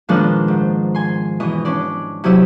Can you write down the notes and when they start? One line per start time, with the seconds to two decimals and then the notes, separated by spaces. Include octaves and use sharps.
0.09 A#2 D#3 F3 G#3 B3 D4
0.48 G#2
0.95 G#5 C6
1.40 B2 E3 D#5
1.65 C#4 D4 D5
2.24 C3 F#3 E4 G4 D#6 E6